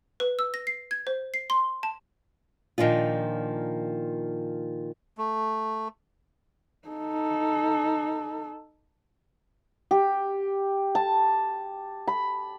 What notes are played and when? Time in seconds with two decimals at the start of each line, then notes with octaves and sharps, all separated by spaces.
0.20 B4
0.39 E6
0.54 A#6
0.67 C7
0.91 G#6
1.07 C5
1.34 C7
1.50 C6
1.83 A5
2.78 A#2 D#3 F3 D4 F4
5.18 A3
6.88 D#4 A4
9.91 G4
10.95 A5
12.07 B5